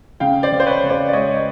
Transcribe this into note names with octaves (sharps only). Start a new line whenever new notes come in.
C#3 F5 G5
C5 D5
C#3
C5
B4 C#5
C#3
C5 D5
D5
G#3 C#5 D#5
C#5 D#5